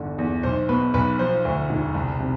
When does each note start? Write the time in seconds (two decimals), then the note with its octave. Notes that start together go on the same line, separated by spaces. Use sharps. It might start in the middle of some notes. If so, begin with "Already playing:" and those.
Already playing: G1 E2 D3
0.18 E2
0.43 B1 C5
0.69 B2 B4
0.94 B1 B4
1.19 F3 C5
1.45 D2
1.70 E1
1.94 C2
2.20 C3